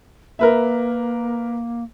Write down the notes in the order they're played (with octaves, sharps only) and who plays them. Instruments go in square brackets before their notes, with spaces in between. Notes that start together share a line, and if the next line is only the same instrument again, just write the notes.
[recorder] A#3 [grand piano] A#4 B4 E5